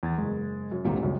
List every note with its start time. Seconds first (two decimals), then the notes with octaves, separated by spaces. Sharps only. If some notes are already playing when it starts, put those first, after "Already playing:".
0.03 E2 G#6 A6
0.18 F#1 G#3
0.71 F#2
0.85 G#1 D2 A#2 G3 A#5
1.03 C#2 F#2